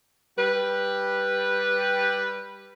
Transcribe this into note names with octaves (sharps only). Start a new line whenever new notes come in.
G3 G4 B4